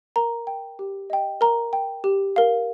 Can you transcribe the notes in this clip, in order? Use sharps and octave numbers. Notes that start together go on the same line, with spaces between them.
A#4 A#5
G5
G4
D#5 G5
A#4 A#5
G5
G4
A#4 F5